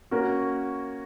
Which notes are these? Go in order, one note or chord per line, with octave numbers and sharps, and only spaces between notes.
A#3 C#4 F#4 A#4